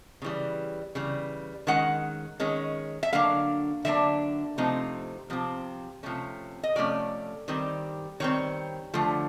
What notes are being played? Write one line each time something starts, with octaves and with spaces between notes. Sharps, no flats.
C#3 E3 G3
C#3 E3 G3
D#3 G#3 C#4 F#5
D#3 G#3 C#4
E5
D3 F#3 A#3 D4 F5
D3 F#3 A#3 D4 E5
C3 F3 A3 C4 D#4
C3 F3 C4
C3 F3 A3 C#4
D#5
C3 F3 A3 C#4 D5
D#3 G3 C4
D#3 G3 C4 C#5
D3 F3 A3